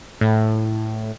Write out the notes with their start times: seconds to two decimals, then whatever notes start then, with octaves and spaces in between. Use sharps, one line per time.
0.21 A2